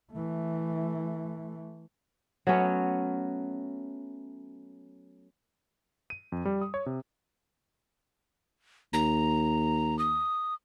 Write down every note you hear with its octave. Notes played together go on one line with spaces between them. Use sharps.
E3 A3
F#3 A3 B3 C#4
D#7
F2
G3
D#6
C#5
C3
D#2 A#5
D#6